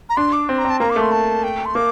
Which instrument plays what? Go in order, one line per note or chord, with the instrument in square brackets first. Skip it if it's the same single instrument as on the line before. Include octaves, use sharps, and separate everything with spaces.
[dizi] A#5
[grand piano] D4 [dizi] C6
[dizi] D6
[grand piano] C4 [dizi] C6
[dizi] A#5
[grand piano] C4
[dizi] A5
[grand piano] A#3 [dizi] A#5
[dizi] D6
[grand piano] A3
[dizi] C6
A5
G5
C6
[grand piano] A#3 [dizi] D6